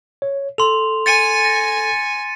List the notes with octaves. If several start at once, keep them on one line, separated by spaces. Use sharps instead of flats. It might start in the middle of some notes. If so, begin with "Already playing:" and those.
C#5
A4 C6 F7
G#5 A6 C#7 D#7
A#6